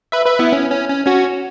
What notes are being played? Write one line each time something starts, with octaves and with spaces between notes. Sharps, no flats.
B4 E5
B4 E5
B3 E4
C#4
C#4
C#4
C#4 F#4